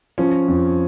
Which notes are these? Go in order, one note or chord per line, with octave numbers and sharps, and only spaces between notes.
F3 C#4
F2